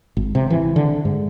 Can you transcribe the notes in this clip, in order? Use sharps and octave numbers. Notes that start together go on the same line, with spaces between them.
G#1
C3
E3
D3
G#2